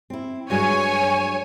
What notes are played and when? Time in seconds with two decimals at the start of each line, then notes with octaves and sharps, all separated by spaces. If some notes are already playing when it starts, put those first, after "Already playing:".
0.10 C4 E4
0.50 G2 F#3 G#3 C#5 G#5